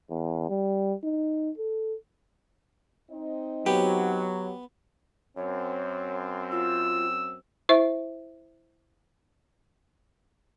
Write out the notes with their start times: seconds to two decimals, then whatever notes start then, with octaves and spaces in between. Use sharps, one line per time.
0.10 E2
0.50 G3
1.04 D#4
1.58 A4
3.11 C4 D#4 D#5
3.66 F#3 B3 G4
5.37 F#2 C4 C#5
6.51 F4 E6
7.69 E4 C5 E5